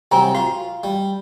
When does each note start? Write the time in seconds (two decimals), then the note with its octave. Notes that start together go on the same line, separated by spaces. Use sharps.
0.11 C2 F#3 C4 G5 G#5 A#5
0.35 F4 F#4
0.84 G3